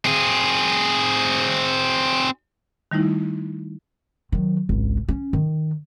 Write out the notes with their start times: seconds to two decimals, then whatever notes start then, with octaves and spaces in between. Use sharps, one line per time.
0.06 C4 G#4
2.91 D#3 G3 A3 D#4 E4
4.32 D#3 F#3
4.69 G#1 C#2
5.09 C#4
5.33 D#3